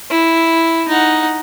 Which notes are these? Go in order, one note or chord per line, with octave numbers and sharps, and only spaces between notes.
E4
D#4 F#5